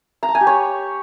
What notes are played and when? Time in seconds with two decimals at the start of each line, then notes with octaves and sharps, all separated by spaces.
0.23 A#5
0.29 A5
0.35 G#5
0.41 G4
0.47 C#5